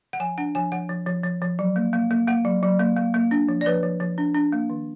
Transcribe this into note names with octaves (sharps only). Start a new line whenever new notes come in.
F#5
F3 G#5
D4 F#5
F3 G#5
F3 F#5
F3
F3
F3
F3
F#3
A#3
A#3
A#3
A#3 F#5
F#3
F#3
A#3
A#3
A#3
D4
F3
D5
F3 B4
F3
F3
D4
D4
A#3
D#3